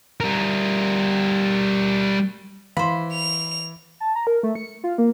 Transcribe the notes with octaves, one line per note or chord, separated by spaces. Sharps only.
G3 A#4
E3 C5 F5 B5 C6
F7
A5
A#5
A#4
A3
C#7
F4
A#3